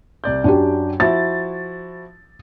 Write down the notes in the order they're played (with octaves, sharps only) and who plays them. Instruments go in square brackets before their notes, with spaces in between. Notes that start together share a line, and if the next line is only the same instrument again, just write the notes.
[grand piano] C2 D5 G6
[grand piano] F#2 [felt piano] D4 F#4 G4
[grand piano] F3 E4 F#4 [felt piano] A6